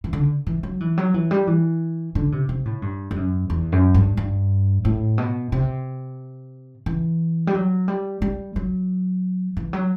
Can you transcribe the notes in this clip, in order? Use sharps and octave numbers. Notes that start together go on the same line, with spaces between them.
E3
D3
E3
F#3
E3
F#3
E3
G3
E3
D3
C3
C3
A2
G2
G2
F#2
E2
F#2
G2
G2
A2
B2
C3
E3
G3
F#3
G3
G3
F#3
E3
F#3